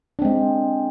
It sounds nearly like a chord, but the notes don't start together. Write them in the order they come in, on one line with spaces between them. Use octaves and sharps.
D4 C4 G#3